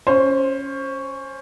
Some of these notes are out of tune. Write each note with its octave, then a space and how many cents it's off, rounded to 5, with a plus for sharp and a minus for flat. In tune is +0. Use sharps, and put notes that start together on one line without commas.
C#4 +0 C5 +20